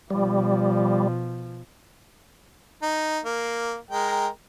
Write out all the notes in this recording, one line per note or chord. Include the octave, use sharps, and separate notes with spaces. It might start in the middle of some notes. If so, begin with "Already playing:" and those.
B2 F3 G3
D#4
A#3
G#3 A#4 G5